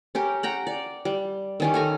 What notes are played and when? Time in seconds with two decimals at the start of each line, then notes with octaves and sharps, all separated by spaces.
0.15 C#4 G4 A#4
0.43 F#5 G5 A#5
0.67 D5
1.05 G3
1.60 D#3 C#4 G4
1.74 A4 G#5 A#5